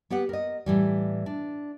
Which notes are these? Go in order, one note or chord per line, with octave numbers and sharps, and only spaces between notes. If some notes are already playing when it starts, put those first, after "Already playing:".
B3 G4 B4 F#5
A#4 D#5
A2 E3 G3
D4